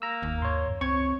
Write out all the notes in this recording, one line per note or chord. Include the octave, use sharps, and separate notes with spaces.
A#3 A#5 E6
F#1 D#2
G#2 C#5 C6
F#2
C#2 C4 C#5 C#6 G#6